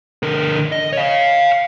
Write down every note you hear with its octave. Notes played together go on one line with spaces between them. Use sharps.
D3 A#4
D#5
C#5 F5